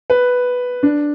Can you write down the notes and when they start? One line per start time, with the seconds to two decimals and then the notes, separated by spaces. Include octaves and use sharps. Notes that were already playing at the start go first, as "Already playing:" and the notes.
0.10 B4
0.83 D4